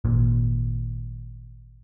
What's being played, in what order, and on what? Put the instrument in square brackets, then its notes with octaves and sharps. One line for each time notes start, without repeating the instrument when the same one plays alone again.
[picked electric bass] G#1 A#2